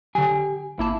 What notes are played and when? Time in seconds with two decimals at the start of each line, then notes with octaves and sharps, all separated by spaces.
0.15 D3 F#3 G4 G#5
0.79 G#1 A#3 E4 A5